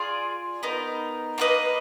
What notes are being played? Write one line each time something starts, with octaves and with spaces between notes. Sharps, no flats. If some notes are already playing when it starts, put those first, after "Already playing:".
Already playing: F4 G#4 D5
B3 D#4 A#4
A#3 F4 B4 D#5